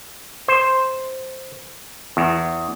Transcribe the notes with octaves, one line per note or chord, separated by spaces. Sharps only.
C5
E2